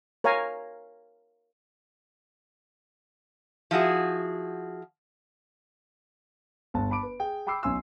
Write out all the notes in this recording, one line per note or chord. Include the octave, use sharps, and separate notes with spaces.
A#4 C#5 F5 G#5 A#5
F3 E4 F#4 G#4
G1 A5
A5 B5 D6 D7
B4
G#4 G5
G5 B5 D6 E6 C7
B1 C#4 G#5 C6 E6